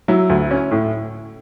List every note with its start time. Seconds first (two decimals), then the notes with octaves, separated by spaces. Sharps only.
0.08 F#3 E4
0.30 D2
0.51 C#4
0.71 A2